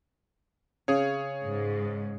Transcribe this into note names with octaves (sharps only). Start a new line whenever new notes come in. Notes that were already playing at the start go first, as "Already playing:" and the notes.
C#3 G#4 C#5
G#2